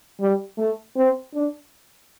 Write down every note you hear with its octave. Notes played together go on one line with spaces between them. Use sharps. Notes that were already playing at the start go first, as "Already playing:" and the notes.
G3
A3
C4
D4